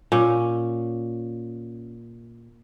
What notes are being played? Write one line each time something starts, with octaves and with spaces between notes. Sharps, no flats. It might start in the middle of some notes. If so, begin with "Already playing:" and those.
A#2 C#4